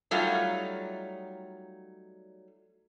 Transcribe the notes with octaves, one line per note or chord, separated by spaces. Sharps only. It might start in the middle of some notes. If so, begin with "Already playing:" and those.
F#3 G3 A3 D#4 F4